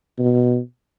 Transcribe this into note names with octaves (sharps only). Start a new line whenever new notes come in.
B2